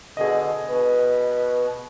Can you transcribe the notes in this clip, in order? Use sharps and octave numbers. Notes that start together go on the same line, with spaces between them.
B2 D3 G#4 D#5
B2 B4